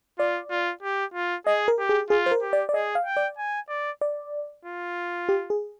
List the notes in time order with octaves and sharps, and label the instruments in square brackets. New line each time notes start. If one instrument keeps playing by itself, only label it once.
[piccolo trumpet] F4 [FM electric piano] D5
[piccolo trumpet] F4
G4
F4
[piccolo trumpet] G#4 [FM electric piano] D#5
[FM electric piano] A#4
[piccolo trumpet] G4
[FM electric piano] G#4
[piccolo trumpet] F4 [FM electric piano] G#4
[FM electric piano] C5
A#4
[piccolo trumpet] G4
[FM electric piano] D5
D5
[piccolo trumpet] G#4 [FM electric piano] D#5
[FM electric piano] F5
[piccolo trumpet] G5
[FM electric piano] D5
[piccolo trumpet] G#5
D5
[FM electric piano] D5
[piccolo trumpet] F4
[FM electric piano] G4
G#4